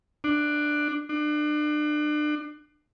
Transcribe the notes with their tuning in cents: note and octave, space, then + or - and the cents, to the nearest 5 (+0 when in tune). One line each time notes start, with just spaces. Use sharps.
D4 +15
D4 +35